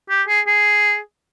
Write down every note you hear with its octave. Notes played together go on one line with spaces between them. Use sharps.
G4
G#4
G#4